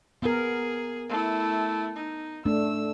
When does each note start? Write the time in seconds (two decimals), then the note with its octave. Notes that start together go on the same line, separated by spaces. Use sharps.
0.22 B3 G#4 A#4
1.09 A3 E4
1.96 D#4
2.45 A3 D4 E6